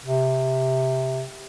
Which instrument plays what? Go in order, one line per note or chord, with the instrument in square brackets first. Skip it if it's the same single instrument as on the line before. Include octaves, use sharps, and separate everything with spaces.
[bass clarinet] C3